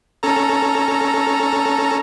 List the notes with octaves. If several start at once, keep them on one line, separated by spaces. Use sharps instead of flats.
C#4 A4 A#5